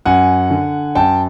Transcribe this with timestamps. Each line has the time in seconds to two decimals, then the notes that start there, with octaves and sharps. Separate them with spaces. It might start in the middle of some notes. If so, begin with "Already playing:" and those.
0.06 F#2 F#5 G#5
0.50 D3
0.95 F#2 G5 A5